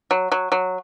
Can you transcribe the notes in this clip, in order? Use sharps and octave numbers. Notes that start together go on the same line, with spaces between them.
F#3
F#3
F#3